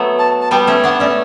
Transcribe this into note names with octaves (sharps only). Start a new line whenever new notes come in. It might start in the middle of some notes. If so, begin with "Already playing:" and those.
Already playing: F#3 A3 B3
A5
A5
G3 B3 G5
A3 C#4
B3 D4 F#5
A3 C#4 D5